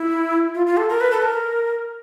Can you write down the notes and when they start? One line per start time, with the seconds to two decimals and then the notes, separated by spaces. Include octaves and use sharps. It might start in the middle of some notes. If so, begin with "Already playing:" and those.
Already playing: E4
0.55 F4
0.66 F4
0.77 A4
0.90 A#4
1.01 B4
1.11 A4
1.22 A#4